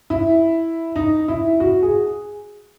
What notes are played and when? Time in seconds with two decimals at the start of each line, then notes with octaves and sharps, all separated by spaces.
0.10 E4
0.96 D#4
1.28 E4
1.60 F#4
1.83 G#4